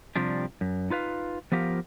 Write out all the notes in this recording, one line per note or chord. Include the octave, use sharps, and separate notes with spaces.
C3 F3 G3 D4
F#2
D#4 F4 B4 F5
F3 B3 F4 G4 A#4